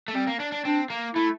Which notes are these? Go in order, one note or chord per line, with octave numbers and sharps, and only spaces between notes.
A3
G3 C4
A#3
D4
D4
C4 D4
A#3
A3 E4